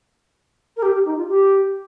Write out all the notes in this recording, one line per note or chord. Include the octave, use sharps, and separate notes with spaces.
A#4
G4
G4
D#4
F4
G4